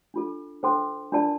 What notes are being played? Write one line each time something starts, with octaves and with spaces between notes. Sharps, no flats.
D4 F4 A4
D4 A4 C5 G5 C6
D4 F4 A#4 D5 A5